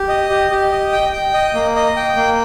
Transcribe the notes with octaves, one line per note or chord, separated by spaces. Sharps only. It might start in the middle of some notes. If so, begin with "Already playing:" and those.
Already playing: G4
D#5
G4
G4
D#5
G5
G5
D#5
A#3
D#5
G5
A#3